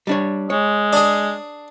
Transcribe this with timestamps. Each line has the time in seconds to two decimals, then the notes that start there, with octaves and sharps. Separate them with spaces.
0.07 G3 D4 C#5
0.50 G#3 C#5
0.93 D4 G#4